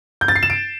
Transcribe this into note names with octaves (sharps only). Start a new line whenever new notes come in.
G6
A6
C7
E7
D7